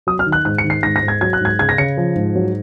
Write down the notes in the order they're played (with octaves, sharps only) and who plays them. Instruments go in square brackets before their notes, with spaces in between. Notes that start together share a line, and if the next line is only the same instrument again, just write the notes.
[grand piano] F#3 D#6
F6
D#3
F#6
G#2 F#6
C#7
D#3
C7
G#2 A#6
A#6
G#2
G#6
F#3 G#6
F#6
G#2 G#6
C#3 G#6
A#6
C#3 C#7
F3
G#2
F#3